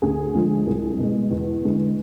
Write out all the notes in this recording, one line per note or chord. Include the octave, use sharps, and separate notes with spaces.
D2 G#4
D3 F3 G#3
C2
B2 G#3
E2
D3 G#3